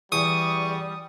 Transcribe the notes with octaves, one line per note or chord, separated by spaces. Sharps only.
E2 G3 C#6 D#6